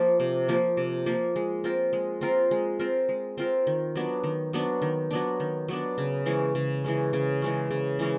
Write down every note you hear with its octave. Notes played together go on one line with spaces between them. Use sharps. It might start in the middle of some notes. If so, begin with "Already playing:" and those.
Already playing: F3 A#3
C3
F3 A#3
C3
F3 A#3
G#3
C4 F4 A#4
G#3
C4 F4 A#4
G#3
C4 F4 A#4
G#3
C4 F4 A#4
D#3
F#3 B3 D4
D#3
F#3 B3 D4
D#3
F#3 B3 D4
D#3
F#3 B3 D4
C#3
E3 G#3 C#4
C#3
E3 G#3 C#4
C#3
E3 G#3 C#4
C#3
E3 G#3 C#4